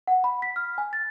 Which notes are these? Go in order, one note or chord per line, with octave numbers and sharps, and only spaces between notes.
F#5
B5
B6
F6
G#5
A6